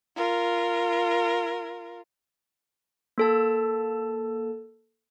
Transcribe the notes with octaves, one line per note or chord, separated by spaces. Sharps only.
F4 A#4
A#3 A4 A5